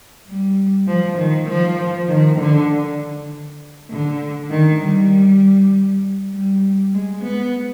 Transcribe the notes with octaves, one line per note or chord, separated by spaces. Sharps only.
G3
F3
D#3
F3
D#3
D3
D3
D#3
G3
G3
G#3
B3